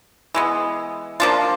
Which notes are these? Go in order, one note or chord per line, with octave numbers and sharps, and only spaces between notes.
E3 G#3 B3
F3 A#3 D4 F4